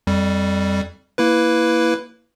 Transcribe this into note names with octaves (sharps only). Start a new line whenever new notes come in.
F2 G3
A#3 E4 B4